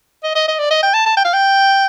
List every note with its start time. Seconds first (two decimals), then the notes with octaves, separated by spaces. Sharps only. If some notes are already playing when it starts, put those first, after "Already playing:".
0.23 D#5
0.35 D#5
0.48 D#5
0.59 D5
0.71 D#5
0.83 G5
0.94 A5
1.06 A5
1.17 G5
1.25 F5
1.34 G5